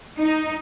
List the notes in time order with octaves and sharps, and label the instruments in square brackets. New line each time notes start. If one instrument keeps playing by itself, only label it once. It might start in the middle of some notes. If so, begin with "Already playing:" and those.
[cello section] D#4